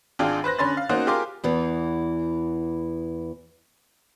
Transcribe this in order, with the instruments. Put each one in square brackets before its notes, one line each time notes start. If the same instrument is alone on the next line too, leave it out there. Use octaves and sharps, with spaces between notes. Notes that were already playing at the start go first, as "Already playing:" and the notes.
[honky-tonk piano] G#1 D4 F4 G#4 G5
B4 C5 F#6 A#6
D3 C#4 B5 C6 A6
F5
A#3 C#4 D#4 F#4 C5 F#5
F4 G4 G#4 A#4 C6 D6
[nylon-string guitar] E2 E3 B3